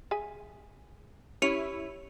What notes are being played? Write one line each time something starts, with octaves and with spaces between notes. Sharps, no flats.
G#4 E5 G#5
C#4 E4 G4 C#7 F7